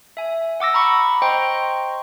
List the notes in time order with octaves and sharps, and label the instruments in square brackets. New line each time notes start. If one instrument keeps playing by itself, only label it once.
[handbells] E5 G#5
F#5 D6 E6 A#6
A#5 B5 C#6
C5 D#5 G5 A#5 C6 C#6